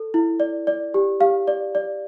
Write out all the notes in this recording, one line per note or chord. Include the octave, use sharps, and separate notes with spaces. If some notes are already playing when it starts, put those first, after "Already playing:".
Already playing: A4
E4
D5
D5
G4
G4 F5
D5
D5